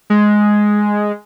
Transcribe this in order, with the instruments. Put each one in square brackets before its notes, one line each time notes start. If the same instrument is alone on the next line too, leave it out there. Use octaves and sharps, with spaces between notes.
[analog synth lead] G#3